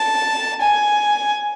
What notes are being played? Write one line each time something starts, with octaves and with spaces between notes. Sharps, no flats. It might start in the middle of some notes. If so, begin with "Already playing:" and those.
Already playing: A5
G#5